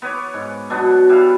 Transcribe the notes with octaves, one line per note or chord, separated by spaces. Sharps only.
B3 B4 C#5 D6
G#2
B2 F#3 B3 D4
G3 E4 B4 F5